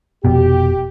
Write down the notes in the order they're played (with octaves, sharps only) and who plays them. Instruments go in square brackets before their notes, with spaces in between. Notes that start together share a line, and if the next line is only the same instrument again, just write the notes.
[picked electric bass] F1 B2 [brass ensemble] G4